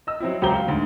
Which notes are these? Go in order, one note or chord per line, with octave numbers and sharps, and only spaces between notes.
D#5 E6
F#3 C4 E4
C#2 F#3 G4 C5 A#5 G7
F5
D2 G#2